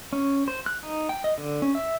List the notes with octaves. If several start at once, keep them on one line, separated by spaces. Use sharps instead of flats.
C#4
C5
F#6
D#4
G5
D#5
D3
C#4
E5